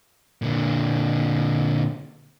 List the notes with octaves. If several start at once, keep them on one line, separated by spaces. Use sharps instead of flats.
A#2 D3